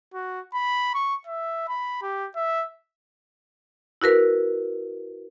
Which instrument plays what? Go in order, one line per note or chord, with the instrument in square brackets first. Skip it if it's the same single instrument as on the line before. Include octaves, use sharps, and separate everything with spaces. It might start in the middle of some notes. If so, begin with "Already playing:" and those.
[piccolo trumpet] F#4
B5
C#6
E5
B5
G4
E5
[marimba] E4 F#4 A#4 B4